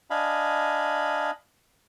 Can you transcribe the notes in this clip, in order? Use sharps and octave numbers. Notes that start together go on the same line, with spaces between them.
D4 D#5 F5 G#5 B5